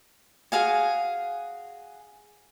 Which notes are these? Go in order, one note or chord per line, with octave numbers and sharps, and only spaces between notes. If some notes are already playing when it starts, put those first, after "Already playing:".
F#4 G#4 F5 G#5